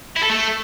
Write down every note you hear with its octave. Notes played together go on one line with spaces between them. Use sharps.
E4
A4
A3